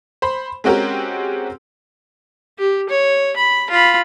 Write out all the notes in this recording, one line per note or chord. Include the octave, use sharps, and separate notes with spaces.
C5 B5
G#3 C4 C#4 F#4 G4 A#4
G4
C#5
B5
F4 B5